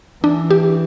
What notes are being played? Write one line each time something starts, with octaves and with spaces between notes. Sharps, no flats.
E3 D4
G4